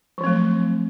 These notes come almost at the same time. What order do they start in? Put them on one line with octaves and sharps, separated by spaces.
F#3 F3 C4 A3